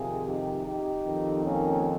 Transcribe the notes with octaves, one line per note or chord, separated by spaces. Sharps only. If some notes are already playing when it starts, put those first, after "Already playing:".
Already playing: F2 C3 D#3 F4 G#4
D#4 G4
D#4 G4
F2 D#3
A#3 C#4